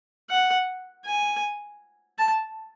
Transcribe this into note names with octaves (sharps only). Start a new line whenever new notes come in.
F#5
G#5
A5